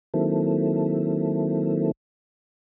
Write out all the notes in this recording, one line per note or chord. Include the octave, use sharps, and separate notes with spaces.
D#3 F#3 A#3 C4 E4 A4